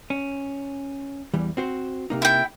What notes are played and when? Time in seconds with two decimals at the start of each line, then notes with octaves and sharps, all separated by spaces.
0.10 C#4
1.34 E2 E3 G3
1.57 C4 F#4 C5
2.10 C3 A#3 D#4
2.22 E4 G5